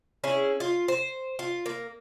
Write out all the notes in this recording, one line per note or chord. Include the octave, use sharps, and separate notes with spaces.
C#4 E4 G#4
F4
C5
F4
A#3